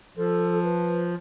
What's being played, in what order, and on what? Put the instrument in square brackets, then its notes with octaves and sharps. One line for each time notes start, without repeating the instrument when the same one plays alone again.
[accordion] F3 [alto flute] A4
[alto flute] B4